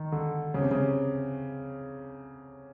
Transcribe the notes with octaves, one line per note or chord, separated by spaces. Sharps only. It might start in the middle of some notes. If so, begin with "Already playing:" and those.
Already playing: D#3
D3
C#3
C3
C#3